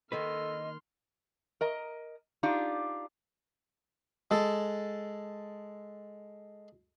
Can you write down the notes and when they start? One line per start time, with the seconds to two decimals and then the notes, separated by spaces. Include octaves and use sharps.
0.12 D#3 A#3 A4 B4 D#5 C6 F6
1.61 A#4 D#5 A#5
2.43 D4 D#4 F4 G4
4.31 G#3 A4